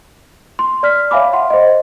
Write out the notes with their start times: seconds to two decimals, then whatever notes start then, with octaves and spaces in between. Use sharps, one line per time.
0.59 C6
0.83 D5 F6 B6
1.11 C#5 E5 F5 G#5 B5 D6
1.33 F#5 C6
1.50 C5 D#5